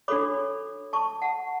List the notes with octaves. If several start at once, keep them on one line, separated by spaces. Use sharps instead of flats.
D4 F#4 A4 C#5 B5 D6
A5 C#6
F#5 A5